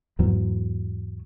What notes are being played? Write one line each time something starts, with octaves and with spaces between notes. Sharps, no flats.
E2 G#2 F#3